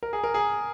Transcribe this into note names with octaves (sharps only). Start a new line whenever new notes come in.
A#4
G#4
A#4
G#4